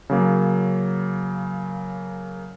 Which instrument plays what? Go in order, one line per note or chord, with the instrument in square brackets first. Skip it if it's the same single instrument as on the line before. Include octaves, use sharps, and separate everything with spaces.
[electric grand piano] C#3 F#3 A#3